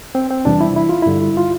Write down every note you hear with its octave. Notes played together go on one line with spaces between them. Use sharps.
C4
C4
E2 C3 E3 G3 D4
E4
E4
F4
G2 D3 G3 E4
F4